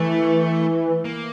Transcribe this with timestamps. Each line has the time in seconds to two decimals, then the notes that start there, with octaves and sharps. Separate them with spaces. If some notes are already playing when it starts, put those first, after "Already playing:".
Already playing: E3 A3
1.05 A#3